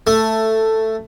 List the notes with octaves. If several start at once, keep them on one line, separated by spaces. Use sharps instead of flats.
A3